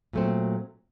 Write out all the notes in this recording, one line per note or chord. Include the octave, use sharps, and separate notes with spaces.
A#2 F#3 A3 C4